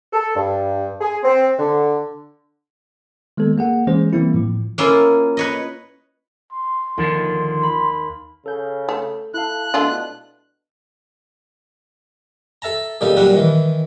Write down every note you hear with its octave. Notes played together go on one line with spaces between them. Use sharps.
A4
G2
G#4
C4
D3
D#3 G#3 A#3 B3 A4
A#3 G#4 F#5
E3 G#3 C#4 G#4 C5
E3 G3 A#3 C4 E4
A2 F3
A#3 C#4 E4 F4
B4 C#5 D#5
C6
D#2 D3 D#3 F3
B5
C#3 A4 G6
A3
E4 A4 F5 F#6
B2 A3 D4 F4
A4 E5 A5 A#5
A#2 C#3 G3 D#4 A4
A#2 F#3 G3 D4 F#5
D#3 E3